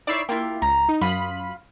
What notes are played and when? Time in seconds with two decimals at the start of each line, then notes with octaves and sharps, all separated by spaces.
0.07 D#4 E4 C#5 D5 E6 C7
0.29 A#3 E4 F4 G4
0.62 C#2 A#5
0.89 D#4
1.01 F#2 F4 B5 D#6